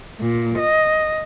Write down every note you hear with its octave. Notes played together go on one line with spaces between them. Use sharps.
A#2
D#5